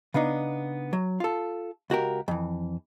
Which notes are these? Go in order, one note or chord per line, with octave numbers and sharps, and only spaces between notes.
C#3 B3 D4 D#4
F#3
F4 A4
C#2 F#4 G4 A#4
F2 E3